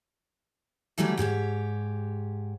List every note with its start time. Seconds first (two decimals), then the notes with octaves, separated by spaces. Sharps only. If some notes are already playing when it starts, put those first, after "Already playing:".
0.98 D3 E3 F#3 G3 A3
1.17 G#2 G4 A4 C#5